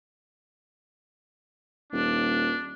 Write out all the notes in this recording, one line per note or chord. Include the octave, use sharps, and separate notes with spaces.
D#1 D4